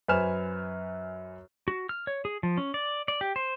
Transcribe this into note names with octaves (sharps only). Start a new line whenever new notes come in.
F#2 B4 C5 G#5 F6 E7
F#4
F6
C#5
G#4
F3
C#4
D5
D5
G4
C5